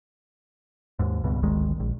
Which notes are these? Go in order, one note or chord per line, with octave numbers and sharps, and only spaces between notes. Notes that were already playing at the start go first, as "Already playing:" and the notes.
D#2 G#2
C#2 G2 B2
G#1 D2 D#3 G#3
A#1